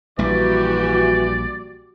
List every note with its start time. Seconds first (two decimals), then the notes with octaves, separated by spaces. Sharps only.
0.19 A#1 E3 G3 F#4 G4 D5